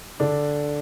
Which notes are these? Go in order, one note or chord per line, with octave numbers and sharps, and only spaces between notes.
D3 D4